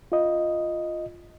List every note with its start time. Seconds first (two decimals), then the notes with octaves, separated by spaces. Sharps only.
0.12 F4 D#5